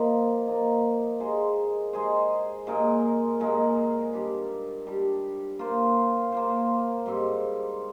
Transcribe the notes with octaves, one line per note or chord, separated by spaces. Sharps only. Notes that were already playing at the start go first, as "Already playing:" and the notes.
Already playing: F3 A#3 D#4
F3 A#3 D#4
G#3 D#4 G#4 C5
G#3 D#4 G#4 C5
A#2 G#3 D#4 A#4
A#2 G#3 D#4 A#4
G3 D4 G4
G3 D4 G4
A#3 F4 C5
A#3 F4 C5
G#2 G3 C4